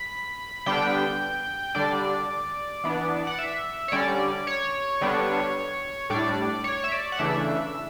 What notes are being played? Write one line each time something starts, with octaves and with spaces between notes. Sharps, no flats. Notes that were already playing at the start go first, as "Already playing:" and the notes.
Already playing: B5
D3 G3 B3 D4 G5
D3 G3 D4 D5
E3 B3 D4
F#5
E5
C#5
D3 G3 C#4 D5
C#5
D3 G3 B3 D4
A2 G3 D4 D5
C#5
E5
D5
F#5
C#3 E3 A3 D4 E5